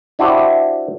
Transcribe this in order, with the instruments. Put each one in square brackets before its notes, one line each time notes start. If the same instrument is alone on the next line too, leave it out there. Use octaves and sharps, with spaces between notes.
[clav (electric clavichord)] D4 E4 F#4 G4 C5 E5